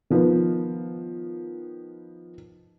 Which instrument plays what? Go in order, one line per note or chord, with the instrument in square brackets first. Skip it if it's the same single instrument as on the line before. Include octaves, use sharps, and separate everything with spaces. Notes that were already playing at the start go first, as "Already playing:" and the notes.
[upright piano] D#3 F3 B3